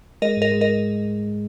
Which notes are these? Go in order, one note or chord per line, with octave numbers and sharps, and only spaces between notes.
G#3 A#4 D#5
G#2 A#4 D#5
G#3
A#4 D#5